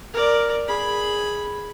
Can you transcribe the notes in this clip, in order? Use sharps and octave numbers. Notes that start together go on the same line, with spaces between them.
A#4 D5
G#4 B5